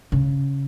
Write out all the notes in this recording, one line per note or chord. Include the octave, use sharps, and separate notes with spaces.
C#3